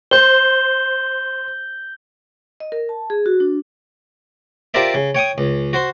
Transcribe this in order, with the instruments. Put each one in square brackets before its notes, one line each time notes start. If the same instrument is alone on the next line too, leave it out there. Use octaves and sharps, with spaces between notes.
[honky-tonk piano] C5 [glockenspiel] G6 G7
[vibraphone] D#5
A#4
A5
G#4
F#4
D4
[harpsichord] F4 G4 A#4 C5 D5 E5
C#3
C#5 G5 C#6 D#6
C#2
F#4 C5 C6